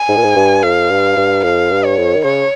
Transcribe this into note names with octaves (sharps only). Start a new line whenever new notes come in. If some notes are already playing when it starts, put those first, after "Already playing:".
Already playing: G#5
G#2
A#2
G#2
G2
F2 F5
G2
G2
F2 F5
G2
C#5
F2
D#3
C#3 C#5